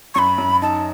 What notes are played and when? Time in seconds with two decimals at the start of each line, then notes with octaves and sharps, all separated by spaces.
0.15 F#2 B5 C#6
0.38 F#2
0.62 D#4 A5